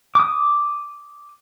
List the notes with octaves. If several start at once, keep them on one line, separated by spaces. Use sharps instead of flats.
D6 D#6